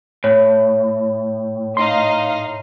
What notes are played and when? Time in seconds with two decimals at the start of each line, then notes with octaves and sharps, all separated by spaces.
0.24 A2 C#5
1.77 D#4 D#5 F5 C6